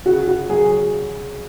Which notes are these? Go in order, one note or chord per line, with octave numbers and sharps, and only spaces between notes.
C#3 F#4
F#4
F#3 G#4
G#4